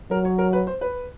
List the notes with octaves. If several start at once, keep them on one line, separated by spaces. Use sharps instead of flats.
F#3 A#4
C#5
A#4
B4
C5
B4